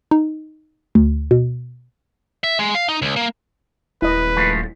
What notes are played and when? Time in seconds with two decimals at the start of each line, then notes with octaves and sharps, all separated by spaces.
0.11 D#4
0.95 D2
1.31 B2
2.44 E5
2.59 G#3
2.75 F5
2.89 D#4
3.02 C#2
3.16 A#3
4.02 D#1 E4 B4 D#5
4.36 F3 G#3 A3